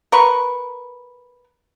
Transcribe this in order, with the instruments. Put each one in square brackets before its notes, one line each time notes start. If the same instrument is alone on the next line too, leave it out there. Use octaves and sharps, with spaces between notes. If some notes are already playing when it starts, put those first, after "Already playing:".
[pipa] A#4 B4 C#6